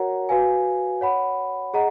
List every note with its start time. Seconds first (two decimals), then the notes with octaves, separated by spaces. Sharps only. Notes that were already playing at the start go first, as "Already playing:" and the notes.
Already playing: F#4 A#4 C#5 F#5 A#5
0.29 F#4 B4 F5 G#5
1.01 C#5 F#5 B5
1.74 G#4 D#5 F#5 A#5